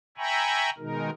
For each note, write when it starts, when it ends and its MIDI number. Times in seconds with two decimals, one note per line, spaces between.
0.18 0.70 76
0.18 0.70 79
0.18 0.70 80
0.18 0.70 82
0.18 0.70 83
0.18 0.70 85
0.78 1.10 47
0.78 1.10 51
0.78 1.10 56
0.78 1.10 63
0.78 1.10 70